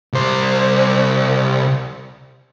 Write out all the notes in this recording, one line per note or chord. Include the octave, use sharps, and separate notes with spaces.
C2 C5